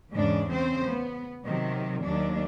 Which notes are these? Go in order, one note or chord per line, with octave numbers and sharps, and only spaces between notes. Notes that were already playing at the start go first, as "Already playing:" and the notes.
E2 G#2 C#3 D4
C#3 C4 C5
B3
C3 D#3 F#3
D#2 F#3 D4